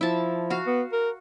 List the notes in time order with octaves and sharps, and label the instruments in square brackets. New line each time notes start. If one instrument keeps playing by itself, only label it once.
[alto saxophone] F3 [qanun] E4 A5
[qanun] F#4 F5
[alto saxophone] B3
A#4